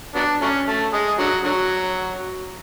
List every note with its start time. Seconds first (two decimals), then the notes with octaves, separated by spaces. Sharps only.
0.15 F#3 B3 D4
0.42 F#3 A3 C#4
0.68 A3
0.93 G#3
1.19 D3 F#3
1.44 D3 F#3